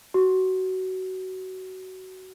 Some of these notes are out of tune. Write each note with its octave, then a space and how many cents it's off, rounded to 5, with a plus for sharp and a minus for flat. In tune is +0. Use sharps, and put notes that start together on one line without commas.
F#4 +20